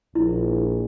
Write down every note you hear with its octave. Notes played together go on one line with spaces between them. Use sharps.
A#1 E4